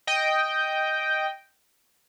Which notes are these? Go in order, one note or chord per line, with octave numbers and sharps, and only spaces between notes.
D#5 G5